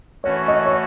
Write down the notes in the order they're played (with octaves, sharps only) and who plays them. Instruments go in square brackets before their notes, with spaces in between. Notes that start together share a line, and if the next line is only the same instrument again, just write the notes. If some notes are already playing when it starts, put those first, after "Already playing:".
[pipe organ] E3 A3 C#4 F#4 [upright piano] C#5
[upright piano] D#5
C#5